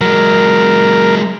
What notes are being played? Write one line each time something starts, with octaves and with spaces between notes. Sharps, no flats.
F#3 G#3 A#4